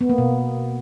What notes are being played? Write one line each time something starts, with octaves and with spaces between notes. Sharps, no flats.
B3
A#3
B2